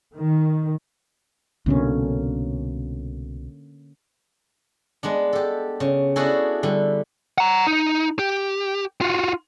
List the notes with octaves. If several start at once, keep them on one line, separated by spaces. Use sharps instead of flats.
D#3
C2 B2 D3 A#3 C#4
G#3 B3 D4
G4 A4
C#3
B3 D4 E4 F#4 G#4 A4
D3 G3
F#5 A#5
D#4
G4
F4 F#4